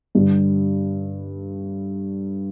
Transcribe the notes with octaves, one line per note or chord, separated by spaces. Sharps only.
G2 D3 G3